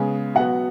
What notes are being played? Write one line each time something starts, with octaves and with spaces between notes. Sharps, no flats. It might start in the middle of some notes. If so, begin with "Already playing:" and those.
Already playing: C#3 G#3 B3
B2 F#3 B3 F#5